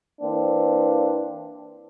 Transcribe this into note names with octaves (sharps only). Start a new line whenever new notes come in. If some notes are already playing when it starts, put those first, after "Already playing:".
E3 A#3 C4 D4